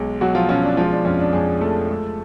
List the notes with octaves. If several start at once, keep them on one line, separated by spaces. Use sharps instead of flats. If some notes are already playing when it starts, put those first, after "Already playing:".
Already playing: B1 G#3
B1 F#3 F#4
F3 F4
B2 C#4
D4
F3 G#3 F4
D4
F2 C#4
D4
F2 G#3 G#4
F3 A3 A4
G#3